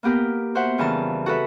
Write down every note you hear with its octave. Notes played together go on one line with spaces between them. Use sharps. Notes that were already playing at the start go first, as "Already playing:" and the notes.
A#3 B3 G4 A#4
F#4 C5 E5 F#5
F2 C#3 E3 G3 A#4 A5
F#4 A4 B4 E5